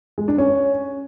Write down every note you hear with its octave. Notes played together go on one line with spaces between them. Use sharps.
G#3
D4
C#4